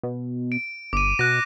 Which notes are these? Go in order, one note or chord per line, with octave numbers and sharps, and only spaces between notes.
B2
D7
G1 D6 D#7
B2 F#6 A#6